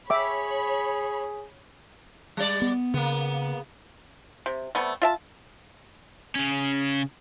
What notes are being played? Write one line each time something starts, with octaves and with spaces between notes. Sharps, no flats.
G#4 C#5 E5 G5 B5 D6
G3 D5
B3
C#3 A#3 B3
C3
C3 G3 A3 B3
F4 E5 A5
C#3 C#4